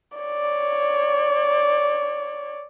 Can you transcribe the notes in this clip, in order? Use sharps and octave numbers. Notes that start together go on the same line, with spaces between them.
C#5 D5